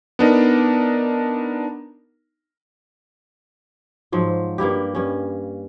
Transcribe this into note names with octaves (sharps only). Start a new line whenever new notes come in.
B3 D4 D#4 A#4
G#2 F3 F#3
G2 A#3 E4 G4
G2 C#4